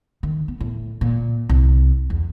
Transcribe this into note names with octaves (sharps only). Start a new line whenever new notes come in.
D#3
B3
A2
A#2
C2
E2